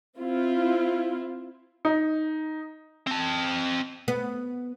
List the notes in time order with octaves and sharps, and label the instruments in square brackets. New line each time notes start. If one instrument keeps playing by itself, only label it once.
[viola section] C4 E4 F4
[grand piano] D#4
[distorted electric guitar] C4 A5
[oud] B3